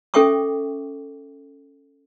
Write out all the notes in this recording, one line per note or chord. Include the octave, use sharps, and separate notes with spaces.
C#4 A4 E5 G5 C#6 D6